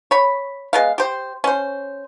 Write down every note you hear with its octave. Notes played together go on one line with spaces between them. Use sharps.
C#5 B5
G#3 B3 F5
G4 C5
C#4 C5